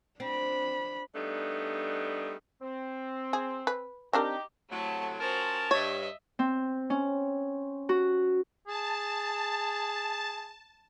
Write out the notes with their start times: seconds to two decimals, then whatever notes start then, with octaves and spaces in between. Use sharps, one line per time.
0.20 C4 D4 B5
1.15 G3 A3 B3 D4 D#4
2.61 C4
3.33 G#4
3.67 B4
4.13 C4 D4 D#4 G4 A#4
4.70 A2 C3 F#3 A3 A5
5.20 F3 C#4 F#4 A#4 C5 A5
5.71 G2 C#5 D#5 E5
6.39 C4
6.90 C#4
7.89 F#4
8.67 G#4 A5